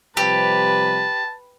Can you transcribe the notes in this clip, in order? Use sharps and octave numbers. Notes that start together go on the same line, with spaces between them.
C3 F3 G3 G4 B4 A5